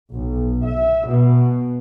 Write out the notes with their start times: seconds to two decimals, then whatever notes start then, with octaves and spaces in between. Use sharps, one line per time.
0.14 B1
0.65 E5
1.09 B2